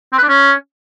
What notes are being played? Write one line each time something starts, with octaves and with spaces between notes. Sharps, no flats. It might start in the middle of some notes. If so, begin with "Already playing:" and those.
C4
B4
D4
C#4